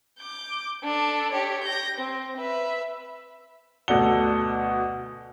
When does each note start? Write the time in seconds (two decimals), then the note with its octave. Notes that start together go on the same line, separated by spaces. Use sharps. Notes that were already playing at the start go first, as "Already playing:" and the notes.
0.19 D6 G6
0.84 D4 A4
1.31 G4 C#5
1.63 G6 A#6
1.98 C4
2.38 B4 E5
3.88 D2 B2 A4 D5 F#5 G7